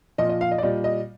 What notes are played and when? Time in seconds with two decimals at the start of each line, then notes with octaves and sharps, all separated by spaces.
0.18 A#2 F3 D#5
0.29 D#5
0.41 F5
0.51 D#5
0.58 D5
0.62 A#2 G3 D#5
0.84 D#5